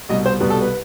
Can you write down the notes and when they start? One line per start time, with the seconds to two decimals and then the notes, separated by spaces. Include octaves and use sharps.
0.09 C2 B2 G3 D#5
0.26 C5
0.40 C2 B2 G3 B4
0.50 A4
0.61 B4